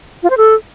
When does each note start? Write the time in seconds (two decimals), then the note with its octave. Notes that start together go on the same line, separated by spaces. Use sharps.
0.23 F4
0.30 C5
0.37 A4